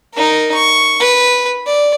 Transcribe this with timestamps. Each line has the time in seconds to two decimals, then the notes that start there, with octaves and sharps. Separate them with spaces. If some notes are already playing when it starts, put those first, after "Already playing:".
0.14 D#4 A#4
0.55 C#6
1.00 B4
1.67 D5